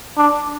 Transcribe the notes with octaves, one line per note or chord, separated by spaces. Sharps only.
D4